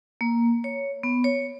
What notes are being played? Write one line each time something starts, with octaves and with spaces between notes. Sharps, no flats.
A#3
C#5
B3
C#5